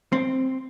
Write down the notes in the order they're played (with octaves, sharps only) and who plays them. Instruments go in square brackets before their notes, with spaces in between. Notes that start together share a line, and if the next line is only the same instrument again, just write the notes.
[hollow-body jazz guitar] C4